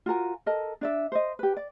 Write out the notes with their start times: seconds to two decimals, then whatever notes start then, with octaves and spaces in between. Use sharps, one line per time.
0.06 F4 F#4 A#4 G#5
0.46 A4 A#4 D#5
0.81 D4 D5 E5
1.12 C5 D#5
1.39 G4 B4
1.57 D5